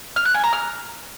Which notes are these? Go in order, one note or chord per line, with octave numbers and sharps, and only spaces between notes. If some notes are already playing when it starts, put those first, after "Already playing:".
F6
F#6
G#5
A#5
F6